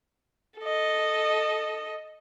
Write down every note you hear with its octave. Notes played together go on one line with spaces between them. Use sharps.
A4 D#5